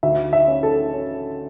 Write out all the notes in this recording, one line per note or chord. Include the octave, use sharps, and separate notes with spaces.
D2 E5
E5
C#4
A4
C#4